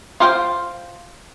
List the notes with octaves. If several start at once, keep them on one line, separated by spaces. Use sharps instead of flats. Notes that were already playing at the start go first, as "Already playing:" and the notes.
F4 C5 F5 G5